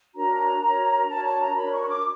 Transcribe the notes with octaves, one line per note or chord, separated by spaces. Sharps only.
D4 F#4 A#4 C#5 A#5
D4 F#4 A#4 C#5
D4 F#4 A#4 C#5 A5
A5
A#5
D4 F#4 A#4 C#5 B5
C#6
C#6
D6